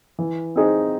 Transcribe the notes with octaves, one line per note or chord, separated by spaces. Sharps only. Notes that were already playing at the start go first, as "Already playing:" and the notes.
E3
C4 D#4 G#4